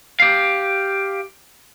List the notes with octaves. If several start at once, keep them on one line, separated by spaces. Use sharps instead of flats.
G4 F5